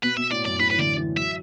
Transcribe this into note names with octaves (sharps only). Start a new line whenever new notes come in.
B2 B4
B2 E5
A2 D5
F#2 D5
A2 B4
B4
E3
D3 D5
E3
F#3 E5